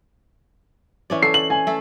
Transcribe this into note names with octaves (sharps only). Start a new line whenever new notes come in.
E3 C#4 D5
A4 C7
F#7
G#5
A3 A4